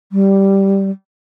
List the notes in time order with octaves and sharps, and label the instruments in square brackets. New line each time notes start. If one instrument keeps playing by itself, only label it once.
[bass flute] G3